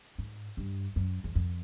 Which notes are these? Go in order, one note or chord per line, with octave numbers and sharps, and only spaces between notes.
G#2
G2
F#2
E2
F2